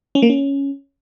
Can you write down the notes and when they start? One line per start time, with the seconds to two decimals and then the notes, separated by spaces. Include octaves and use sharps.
0.15 C#4
0.22 A#3
0.30 C#4